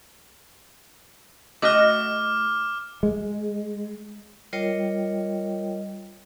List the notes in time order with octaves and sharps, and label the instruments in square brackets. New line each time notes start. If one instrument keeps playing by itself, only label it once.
[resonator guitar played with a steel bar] A3 F#4 D#5 [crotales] D6 F6
[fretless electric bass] G#3
[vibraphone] G3 F4 A#4 C#5 D#5 G5